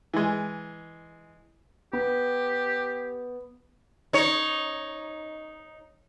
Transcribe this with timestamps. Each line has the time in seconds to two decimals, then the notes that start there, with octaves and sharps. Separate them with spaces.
0.14 E3 G#3
1.93 B3 G4
4.13 D#4 C#5